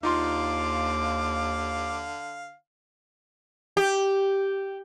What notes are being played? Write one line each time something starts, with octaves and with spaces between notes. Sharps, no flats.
D#2 D3 D#4 F4 F5 C6 D6
G4